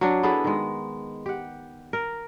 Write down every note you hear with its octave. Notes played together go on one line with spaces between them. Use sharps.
F#3 D4
B3 E4 G#4 A4
D#3 G#3
G4 F#5
A#4